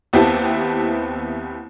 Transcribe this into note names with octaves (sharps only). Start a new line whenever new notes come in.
D#2 B3 C4 E4 G4 A5